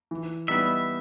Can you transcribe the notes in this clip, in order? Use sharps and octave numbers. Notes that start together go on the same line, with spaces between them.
E3
G3 B3 D#4 E5